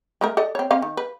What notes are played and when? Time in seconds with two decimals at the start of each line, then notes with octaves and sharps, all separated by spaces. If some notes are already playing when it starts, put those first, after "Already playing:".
0.21 G#3 A3 A#4
0.37 A4 D5 D#5
0.55 C4 C#5
0.71 C4 F5
0.82 D#3
0.97 B4